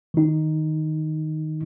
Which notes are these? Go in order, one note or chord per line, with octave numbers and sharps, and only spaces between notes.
D#3 D#4